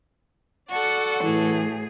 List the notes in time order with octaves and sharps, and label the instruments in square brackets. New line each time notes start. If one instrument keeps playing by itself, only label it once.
[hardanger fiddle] F#4 A4 [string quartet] D5 F#5
[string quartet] A2 G#4 [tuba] E3